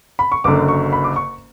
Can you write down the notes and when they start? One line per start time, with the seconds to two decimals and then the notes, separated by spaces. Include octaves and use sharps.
0.19 B5
0.32 C#6
0.44 F#1 F#2 D3 D6
0.68 C#6
0.93 B5
1.04 D6
1.16 C#6